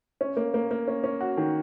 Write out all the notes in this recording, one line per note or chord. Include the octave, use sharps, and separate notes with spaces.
C#4
A#3
A#3
A#3
C#4
C#4
F#4
D#3